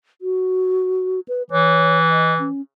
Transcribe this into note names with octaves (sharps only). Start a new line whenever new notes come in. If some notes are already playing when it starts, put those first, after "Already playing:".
F#4
B4
E3 C#5
D#5
C#4